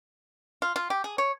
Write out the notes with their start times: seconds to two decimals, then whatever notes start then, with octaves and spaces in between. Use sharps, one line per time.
0.62 F4
0.76 F4
0.90 G4
1.04 G#4
1.18 C#5